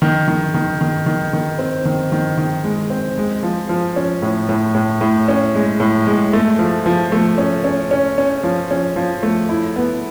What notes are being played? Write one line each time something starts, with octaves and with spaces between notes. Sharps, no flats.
D#3
D#3
D#3
D#3
D#3
D#3
C4
D#3
D#3
D#3
G#3
C4
G#3
F3
F3
C#4
A2
A2
A2
A2
C#4
G#3
A2
G#3
A3
F3
F3
A3
C#4
C#4
C#4
C#4
F3
C#4
F3
A3
E4
B3